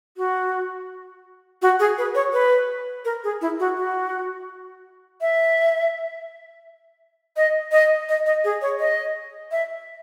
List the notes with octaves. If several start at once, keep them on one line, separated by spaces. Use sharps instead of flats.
F#4
F#4
G#4
B4
C#5
B4
A#4
G#4
E4
F#4
F#4
E5
D#5
D#5
D#5
D#5
G#4
C#5
D#5
E5